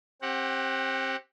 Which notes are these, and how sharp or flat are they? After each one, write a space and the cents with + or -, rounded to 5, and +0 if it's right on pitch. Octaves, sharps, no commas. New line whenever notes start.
C4 +30 G4 +0 F#5 +0